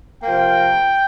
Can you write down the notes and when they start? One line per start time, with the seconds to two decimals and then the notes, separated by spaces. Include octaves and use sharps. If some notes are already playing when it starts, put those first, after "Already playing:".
0.23 C3 F3 A#3 G5